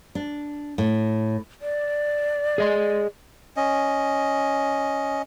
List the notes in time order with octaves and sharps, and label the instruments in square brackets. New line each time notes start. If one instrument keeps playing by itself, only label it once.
[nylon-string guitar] D4
A2
[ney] D5
[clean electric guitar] G#4 D#5 C6
[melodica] C#4 D#5